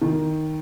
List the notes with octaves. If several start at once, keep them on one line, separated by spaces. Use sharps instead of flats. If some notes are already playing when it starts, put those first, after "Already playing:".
D#3